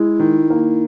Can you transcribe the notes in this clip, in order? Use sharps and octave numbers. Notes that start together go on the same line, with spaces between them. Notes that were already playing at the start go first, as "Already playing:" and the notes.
Already playing: G#3 E4
D#3
A#3